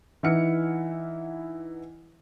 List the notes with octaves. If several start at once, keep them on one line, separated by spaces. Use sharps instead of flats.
E3 D#4 E4 F#5 F6 C#7